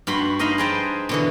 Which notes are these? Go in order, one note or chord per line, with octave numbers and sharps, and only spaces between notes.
G2 F#4 B5 C6
D#4 D#5 F5 B5 C6
G#4 B4 C5 G5 A5 A#5
B2 D3 E3